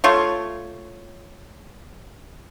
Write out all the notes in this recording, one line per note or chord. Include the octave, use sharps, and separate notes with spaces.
A3 F4 C#5